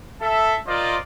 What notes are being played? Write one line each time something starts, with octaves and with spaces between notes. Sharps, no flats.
A4 E5
F4 A#4 C5 D5 D#5